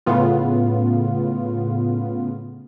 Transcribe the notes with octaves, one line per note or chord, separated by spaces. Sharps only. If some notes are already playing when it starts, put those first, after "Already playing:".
A2 C#3 B3 F4